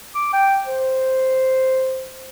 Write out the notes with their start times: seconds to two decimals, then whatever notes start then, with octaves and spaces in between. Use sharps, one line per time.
0.15 D6
0.33 G5
0.65 C5